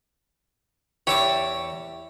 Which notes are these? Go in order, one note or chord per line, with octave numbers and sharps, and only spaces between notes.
E2 G4 C#5 E5 D6